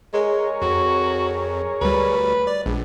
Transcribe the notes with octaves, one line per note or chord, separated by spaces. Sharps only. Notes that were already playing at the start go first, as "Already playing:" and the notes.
G#3 G#4 A#4 C#5
F2 F#4
D2 G3 B4
D5
A#1 G#3